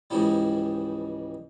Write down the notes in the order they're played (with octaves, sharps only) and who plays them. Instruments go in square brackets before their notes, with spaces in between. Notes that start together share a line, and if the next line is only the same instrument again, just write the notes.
[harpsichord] C#2 G#2 C#3 E3 F3 G3